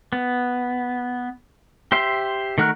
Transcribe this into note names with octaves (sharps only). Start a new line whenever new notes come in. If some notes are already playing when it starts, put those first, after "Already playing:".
B3
G4 C5 E5 C6
D#3 A3 F#4 A#4 F#6